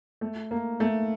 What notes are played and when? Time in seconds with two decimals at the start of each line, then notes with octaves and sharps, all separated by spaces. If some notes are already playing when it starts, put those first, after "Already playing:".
0.21 A3
0.51 A#3
0.80 A3